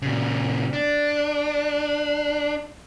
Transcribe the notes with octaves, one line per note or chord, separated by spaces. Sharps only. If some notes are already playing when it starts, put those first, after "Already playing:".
A#2 C#3
D4